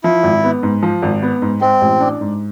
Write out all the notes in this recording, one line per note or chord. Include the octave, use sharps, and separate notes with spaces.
F3 E4
G#1
B3
G#2
F3
G#1
B3
G#2
G#3 C4
A1
D4
G#2